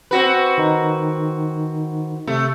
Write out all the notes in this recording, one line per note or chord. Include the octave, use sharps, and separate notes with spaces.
C4 F#4 B4
D#3 D#4
C3 A3